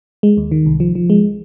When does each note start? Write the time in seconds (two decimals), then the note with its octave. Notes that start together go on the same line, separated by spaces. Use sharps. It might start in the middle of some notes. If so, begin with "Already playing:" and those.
0.23 G#3
0.37 D#2
0.51 D#3
0.66 C2
0.80 F3
0.95 F3
1.10 G#3